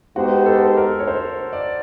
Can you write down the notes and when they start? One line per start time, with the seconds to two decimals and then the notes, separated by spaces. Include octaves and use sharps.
0.16 G#3 B3 D#4 F#4 G4 C5
0.46 A4
0.77 A#4
0.99 C#5
1.07 C5
1.53 D5